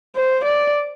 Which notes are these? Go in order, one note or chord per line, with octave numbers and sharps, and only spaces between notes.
C5
D5